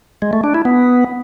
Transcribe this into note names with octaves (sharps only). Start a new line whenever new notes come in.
G#3
A3
D4
E4
B3